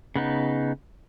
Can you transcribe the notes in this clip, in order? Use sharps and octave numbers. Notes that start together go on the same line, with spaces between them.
C#3 B3 D#4